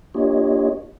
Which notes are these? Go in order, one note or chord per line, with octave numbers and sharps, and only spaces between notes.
A#3 D4 F4 G4 C#5 D#5